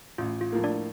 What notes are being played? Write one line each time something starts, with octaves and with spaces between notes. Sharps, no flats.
A1 F4
F4
A2 F3 A#3
D4 D5